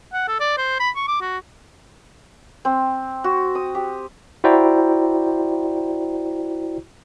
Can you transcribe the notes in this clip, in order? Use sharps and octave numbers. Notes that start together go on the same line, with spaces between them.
F#5
A4
D5
C5
B5
C#6
D6
F#4
C4
F#4
D#6
G4
E4 F#4 C5 D5 G5 A#5